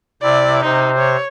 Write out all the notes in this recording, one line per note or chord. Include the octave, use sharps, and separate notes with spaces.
C3 E4 D5
C3 D#4 C5
C#5